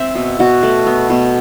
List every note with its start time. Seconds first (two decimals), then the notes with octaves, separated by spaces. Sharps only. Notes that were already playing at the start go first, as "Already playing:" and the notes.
Already playing: C4 E5
0.15 B2
0.39 B2 F#4
0.63 A3
0.87 B3
1.10 B2